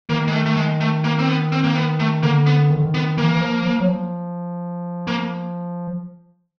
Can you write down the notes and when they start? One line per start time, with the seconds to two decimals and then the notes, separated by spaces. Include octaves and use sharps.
0.09 D#3 A#3
0.28 G#3
0.33 A3
0.46 A3
0.57 G#3
0.81 A3
1.04 A#3
1.19 C4
1.28 B3
1.52 C4
1.64 A#3
1.75 B3
2.00 A3
2.23 D3 A#3
2.46 B3
2.70 D#3
2.77 D3
2.85 D#3
2.94 B3
3.18 E3 A#3
3.35 E3
3.41 F3
3.66 F3
3.80 F#3
3.89 F3
5.07 A#3